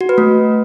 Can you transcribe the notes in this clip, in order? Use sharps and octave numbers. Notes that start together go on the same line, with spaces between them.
F#4
B4
A3